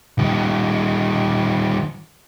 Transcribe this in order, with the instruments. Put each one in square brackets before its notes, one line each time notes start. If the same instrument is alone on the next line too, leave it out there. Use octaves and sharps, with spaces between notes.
[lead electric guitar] D#3 G3